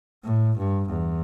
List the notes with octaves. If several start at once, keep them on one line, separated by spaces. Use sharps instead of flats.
A2
G2
E2